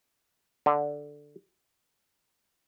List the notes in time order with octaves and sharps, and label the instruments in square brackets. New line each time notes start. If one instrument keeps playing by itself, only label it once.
[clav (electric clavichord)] D3